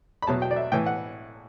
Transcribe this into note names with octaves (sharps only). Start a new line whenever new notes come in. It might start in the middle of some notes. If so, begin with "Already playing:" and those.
B5
E2 B2 F#3 A5
G5
D5
E5
A2 E3 G5
F#5